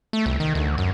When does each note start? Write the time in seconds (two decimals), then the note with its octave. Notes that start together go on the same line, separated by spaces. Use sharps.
0.13 A3
0.26 C2
0.40 D#3
0.55 D2
0.78 F#2